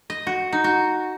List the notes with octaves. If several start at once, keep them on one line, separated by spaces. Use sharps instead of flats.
D#5
F#4
D#4
F#4